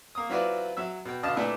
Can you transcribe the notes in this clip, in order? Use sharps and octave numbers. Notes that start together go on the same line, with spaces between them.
A#3 D#6
F#3 C4 E4 F4 B4 D5
F#3 E5 E6
B2 G5
B2 D3 D#5 F5 A5
A#2 A3 D4 E4 B4 E5